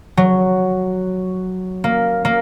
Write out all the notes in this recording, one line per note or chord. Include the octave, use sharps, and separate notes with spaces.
F#3
A#3
A#3